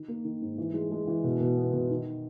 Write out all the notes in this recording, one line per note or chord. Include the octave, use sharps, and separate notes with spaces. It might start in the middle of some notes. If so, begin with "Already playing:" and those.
Already playing: D#3
A#3
D#3
G#2
E3
G#3
G#3
E3
B2
B2
B3
B2
D#3